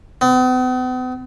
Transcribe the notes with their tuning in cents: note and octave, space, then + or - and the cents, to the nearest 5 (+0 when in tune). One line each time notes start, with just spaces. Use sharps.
B3 +45